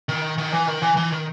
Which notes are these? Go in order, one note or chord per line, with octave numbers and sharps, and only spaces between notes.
D#3
D#3
E3
D#3
E3
E3
D#3